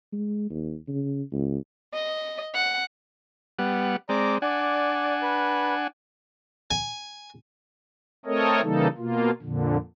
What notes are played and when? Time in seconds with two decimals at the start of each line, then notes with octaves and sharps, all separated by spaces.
0.13 G#3
0.50 D#2
0.88 C#3
1.32 C#2
1.94 D#5
2.54 F#5
3.59 G3 B3 F#5
4.09 G#3 C4 D5 A#5 D6
4.42 D4 D5 F#5 G#5
5.22 B4
6.71 G#5
8.26 A3 C4 A4 A#4 C#5 D#5
8.62 C#3 E3 G3 A#3 D#4 A4
8.98 B2 A#3 F4
9.42 F2 A#2 D3